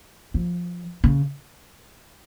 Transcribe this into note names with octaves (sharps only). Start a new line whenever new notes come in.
F3
C#3